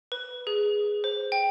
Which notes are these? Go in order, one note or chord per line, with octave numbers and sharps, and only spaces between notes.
B4
G#4
C5
G5